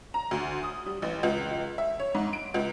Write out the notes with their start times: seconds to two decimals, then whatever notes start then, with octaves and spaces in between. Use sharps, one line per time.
0.14 A#5
0.31 D2
0.63 D#6
0.86 G3
1.02 A1
1.23 C#2
1.78 E5
2.00 C#5
2.15 G#2
2.33 D7
2.54 C#2